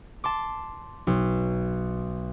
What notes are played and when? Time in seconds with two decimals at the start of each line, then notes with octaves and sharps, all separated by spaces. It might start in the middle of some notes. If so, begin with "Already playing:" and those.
0.24 A5 C6 D6
1.07 B1